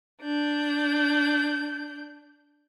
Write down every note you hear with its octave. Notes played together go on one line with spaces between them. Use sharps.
D4 G6